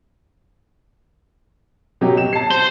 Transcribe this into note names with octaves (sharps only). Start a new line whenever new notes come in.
B2 F#3 G4
E7
A5 C7
C5